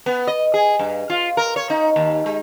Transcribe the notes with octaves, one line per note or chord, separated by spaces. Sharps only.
B3
D#5
G#4
G2
F4
A#4
C#5
D#4
D#2
G#3